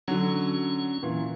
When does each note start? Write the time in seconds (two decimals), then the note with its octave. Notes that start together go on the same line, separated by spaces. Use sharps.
0.08 D3 F#3 C#4
1.03 A#2 E3